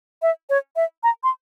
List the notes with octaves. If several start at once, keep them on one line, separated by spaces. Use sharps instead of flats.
E5
C#5
E5
A#5
C6